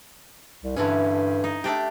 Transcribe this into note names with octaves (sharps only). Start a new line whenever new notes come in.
C2
G2 D3 E3 C#4
D#4
A3 D4 G4